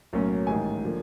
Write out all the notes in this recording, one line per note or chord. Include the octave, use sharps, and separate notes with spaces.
B1 A2 F#3 A#3 C#4
A1 G#2 D#3 G#5
D3 F3 A#3